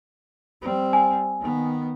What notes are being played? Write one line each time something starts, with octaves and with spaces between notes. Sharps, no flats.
G3 C4
G#5
D#3 B3